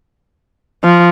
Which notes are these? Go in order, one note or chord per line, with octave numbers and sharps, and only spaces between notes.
F3